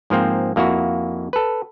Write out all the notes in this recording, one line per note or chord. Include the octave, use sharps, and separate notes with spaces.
G#2 F3 A#3 C4
F2 A#3 E4 F#4
A4 B4